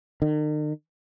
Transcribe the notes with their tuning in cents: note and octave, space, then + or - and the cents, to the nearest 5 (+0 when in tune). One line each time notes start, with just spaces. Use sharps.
D#3 -45